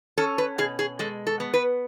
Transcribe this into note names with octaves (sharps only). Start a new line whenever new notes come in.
C#4 A4
B4
B2 G#4
G#4
G#3 A4
A4
B3
B4